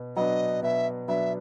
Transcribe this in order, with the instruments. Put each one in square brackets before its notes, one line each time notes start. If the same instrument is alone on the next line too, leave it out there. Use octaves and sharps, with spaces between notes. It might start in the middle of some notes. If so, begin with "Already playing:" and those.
Already playing: [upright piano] B2
[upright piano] F#3 B3 D4 [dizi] D#5
[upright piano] B2 [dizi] E5
[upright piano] F#3 B3 D4 [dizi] E5